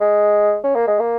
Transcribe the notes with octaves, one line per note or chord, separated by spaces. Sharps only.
G#3
C#4
A#3
G#3
A#3